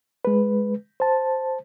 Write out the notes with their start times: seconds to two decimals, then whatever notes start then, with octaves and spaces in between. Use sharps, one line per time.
0.25 G#3 B4
1.00 C5 A5